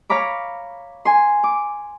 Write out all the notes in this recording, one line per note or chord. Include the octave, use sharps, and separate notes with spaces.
C#5 F5 A#5 B5 D6
G#5 C6
D6